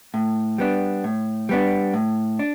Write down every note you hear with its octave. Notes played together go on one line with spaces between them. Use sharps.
A2
G3 B3 D4
A2
G3 B3 D4
A2
D4